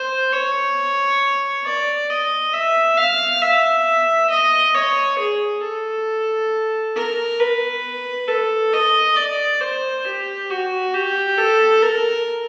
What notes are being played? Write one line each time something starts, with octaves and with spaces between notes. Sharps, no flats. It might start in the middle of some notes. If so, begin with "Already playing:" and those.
Already playing: C5
C#5
D5
D#5
E5
F5
E5
D#5
C#5
G#4
A4
A#4
B4
A4
D#5
D5
C5
G4
F#4
G4
A4
A#4